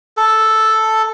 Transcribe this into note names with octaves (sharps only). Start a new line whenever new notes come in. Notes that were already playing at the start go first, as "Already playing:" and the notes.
A4